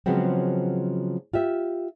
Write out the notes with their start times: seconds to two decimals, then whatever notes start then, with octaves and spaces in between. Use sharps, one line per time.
0.06 C#3 F3 F#3 G#3 B3 C4
1.34 F4 G4 E5